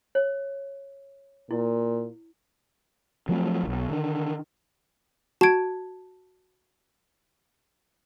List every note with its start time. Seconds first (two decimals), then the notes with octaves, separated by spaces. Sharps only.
0.15 C#5
1.51 A#2 E4
3.29 F3 F#3 A3 C4
3.63 E1 B1
3.88 D3 D#3
5.41 F#4 A5 G#6 D7